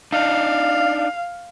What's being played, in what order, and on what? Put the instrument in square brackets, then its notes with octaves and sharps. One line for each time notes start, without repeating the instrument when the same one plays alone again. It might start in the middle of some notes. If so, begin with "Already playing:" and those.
[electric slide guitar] D4 D#4 [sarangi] F5